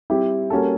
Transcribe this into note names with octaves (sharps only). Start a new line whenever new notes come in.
G3 C4 E4 G4
G3 A#3 C#4 F#4 A4